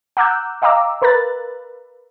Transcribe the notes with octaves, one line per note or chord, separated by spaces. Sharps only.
F#5 A#5 D6 E6 F#6 G6
D#5 F5 G5 A#5 D6 E6
A#4 B4 A#5 B5 F#6 A6